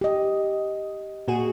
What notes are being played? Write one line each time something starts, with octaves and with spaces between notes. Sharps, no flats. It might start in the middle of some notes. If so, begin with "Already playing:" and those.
G4 D#5
A#2 F#4 G#4